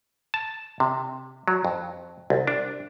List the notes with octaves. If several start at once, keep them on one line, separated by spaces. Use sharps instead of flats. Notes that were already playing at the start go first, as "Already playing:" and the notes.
A5
C3
F#3
F2
C2
D4